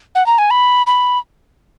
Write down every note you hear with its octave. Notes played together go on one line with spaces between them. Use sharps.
F#5
A#5
G#5
B5
B5